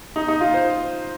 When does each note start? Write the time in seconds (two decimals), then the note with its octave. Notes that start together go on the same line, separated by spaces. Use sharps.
0.16 D#4
0.28 D#4
0.41 F4
0.54 C5